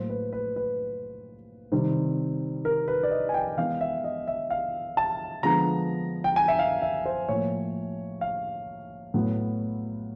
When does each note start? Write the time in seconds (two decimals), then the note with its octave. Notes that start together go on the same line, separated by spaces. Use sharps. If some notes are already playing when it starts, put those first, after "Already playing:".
Already playing: A2 F#3 A#3 C5
0.10 B4
0.33 B4
0.56 B4
1.72 C3 D#3 G3 C4
2.65 A#4
2.88 B4
3.03 D5
3.11 D#5
3.29 G#5
3.34 G5
3.57 E3 G#3 B3 F5
3.81 E5
4.04 D#5
4.27 E5
4.50 F5
4.97 A5
5.43 D3 F3 G#3 B3 A#5
6.24 G5
6.36 G#5
6.48 E5
6.59 F5
6.82 E5
7.06 C5
7.29 A2 F3 A#3 C#5
8.21 F5
9.14 A2 F#3 B3